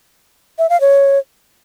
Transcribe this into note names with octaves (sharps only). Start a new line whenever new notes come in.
E5
F5
C#5